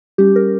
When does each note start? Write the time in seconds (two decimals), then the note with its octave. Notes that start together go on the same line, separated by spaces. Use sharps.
0.18 G3 C#4 G4
0.36 A#4